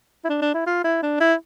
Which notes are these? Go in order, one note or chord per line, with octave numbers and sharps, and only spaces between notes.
E4
D4
D4
E4
F4
E4
D4
E4